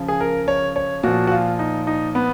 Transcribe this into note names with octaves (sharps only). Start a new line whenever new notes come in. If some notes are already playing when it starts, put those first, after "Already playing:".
Already playing: C#3 F3
G#4
A#4
C#5
C#5
A#2 F3 F#4
F#4
F4
D#4
D#4
B3